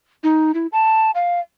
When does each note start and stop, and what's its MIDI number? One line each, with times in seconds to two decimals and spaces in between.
0.24 0.52 63
0.54 0.67 64
0.72 1.11 81
1.15 1.40 77